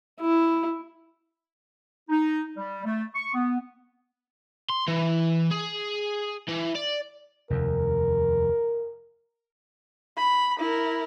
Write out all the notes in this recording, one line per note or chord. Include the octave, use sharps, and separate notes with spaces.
E4
D#4
G3
A3
C#6
B3
C6
E3
G#4
E3
D5
F1 D#2 A#4
B5
E4 A#4